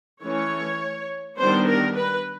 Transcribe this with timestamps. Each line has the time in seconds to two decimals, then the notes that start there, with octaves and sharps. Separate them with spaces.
0.23 E3 A3 C#4 C#5
1.38 D#3 G3 B3 D4 C5
1.67 A#4
1.96 B4